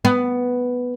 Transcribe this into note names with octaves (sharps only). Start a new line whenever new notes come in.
B3